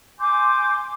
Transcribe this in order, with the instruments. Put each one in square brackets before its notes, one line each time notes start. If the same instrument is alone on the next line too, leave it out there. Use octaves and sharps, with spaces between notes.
[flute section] G#5 C6 D6 G6